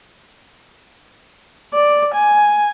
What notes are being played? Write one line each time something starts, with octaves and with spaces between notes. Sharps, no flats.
D5
G#5